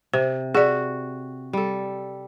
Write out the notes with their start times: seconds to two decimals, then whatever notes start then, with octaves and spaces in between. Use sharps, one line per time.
0.13 C3 C5
0.55 F#4 G#4 D5
1.53 G3 A4